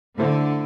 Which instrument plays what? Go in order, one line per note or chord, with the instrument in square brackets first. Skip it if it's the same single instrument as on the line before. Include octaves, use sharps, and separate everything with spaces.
[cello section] D3 [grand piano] A3 E4 A4 C5